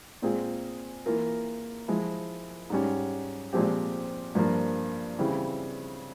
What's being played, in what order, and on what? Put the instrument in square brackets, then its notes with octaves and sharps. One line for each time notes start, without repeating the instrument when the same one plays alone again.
[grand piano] A#2 G#3 C4 F4 G#4
E3 A#3 F4 A#4
F3 G#3 E4
G#2 G3 C#4
A#2 F3 G#3 C4 G4
G2 F3 A#3
C#3 E3 G3 C4 E4